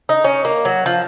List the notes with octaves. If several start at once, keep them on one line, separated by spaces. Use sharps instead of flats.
D#4
C#4
A#3
F#3
F3